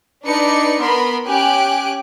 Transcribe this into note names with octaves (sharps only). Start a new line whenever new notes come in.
D4 D#4 B4 D5 C#7
B3 A#4 B5 C6
C#4 G4 G#5 F#6 D7